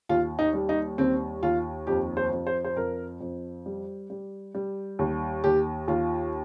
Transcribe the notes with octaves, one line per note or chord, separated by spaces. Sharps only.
D#2 F4
D#4
G3
D#4
D#2 C4
D#2 F4
F2 G4
C5
F2
C5
C5
F2 A#4
F2
G3
G3
G3
D#2
D#2 G4
D#2 F4